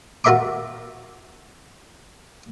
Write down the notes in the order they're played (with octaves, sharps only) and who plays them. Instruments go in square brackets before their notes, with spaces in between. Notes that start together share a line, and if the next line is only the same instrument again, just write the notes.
[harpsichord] F4 F#4 A#4 E5 C6 D6